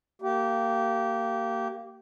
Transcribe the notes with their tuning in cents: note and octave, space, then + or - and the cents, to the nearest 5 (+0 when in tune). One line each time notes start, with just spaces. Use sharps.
A#3 -25 G4 -25